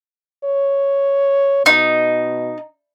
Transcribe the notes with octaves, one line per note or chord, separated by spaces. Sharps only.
C#5
B2 D#4